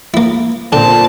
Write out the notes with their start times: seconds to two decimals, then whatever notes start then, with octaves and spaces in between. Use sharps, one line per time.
0.14 A#3 E4
0.73 A#2 D3 C4 A5